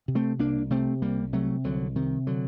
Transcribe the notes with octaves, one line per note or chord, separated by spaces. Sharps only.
C3
A3 C4
C2 A#3 D4
C3 A3 C4
C2 G3 A#3
C3 F#3 A3
C2 D3 F#3
C3 D#3
D3 F#3